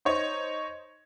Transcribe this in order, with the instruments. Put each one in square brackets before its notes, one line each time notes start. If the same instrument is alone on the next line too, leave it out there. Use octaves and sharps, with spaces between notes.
[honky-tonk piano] D#4 C5 C#5 D#5